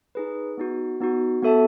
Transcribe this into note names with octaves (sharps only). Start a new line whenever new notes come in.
D#4 G#4 B4
B3 D#4 F#4
B3 D#4 F#4
B3 F#4 A4 E5 A5